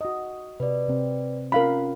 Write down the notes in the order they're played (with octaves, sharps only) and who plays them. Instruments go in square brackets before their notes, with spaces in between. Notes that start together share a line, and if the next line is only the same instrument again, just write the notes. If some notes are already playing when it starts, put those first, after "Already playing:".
[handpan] F#4 D#5
[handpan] C3 [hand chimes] B4 D5
[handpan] C3 C4
[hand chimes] C#4 F4 [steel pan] A#4 F5 B5